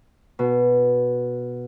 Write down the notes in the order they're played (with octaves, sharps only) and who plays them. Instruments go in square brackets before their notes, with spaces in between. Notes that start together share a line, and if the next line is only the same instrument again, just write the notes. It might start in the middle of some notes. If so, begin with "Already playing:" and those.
[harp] B2